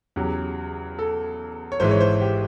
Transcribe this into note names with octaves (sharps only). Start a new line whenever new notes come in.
E2 C#3 F#3 G4
A4
C#5
G#1 G#2 E3 G#3 C5
C#5
C5
G4